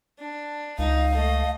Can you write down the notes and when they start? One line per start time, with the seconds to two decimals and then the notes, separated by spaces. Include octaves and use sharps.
0.19 D4
0.79 C#2 D#4 F5
1.14 A3 D#5